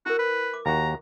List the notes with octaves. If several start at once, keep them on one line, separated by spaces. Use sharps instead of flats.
E4 F#4 A#4
B4
D6
D#2 F#4 A#5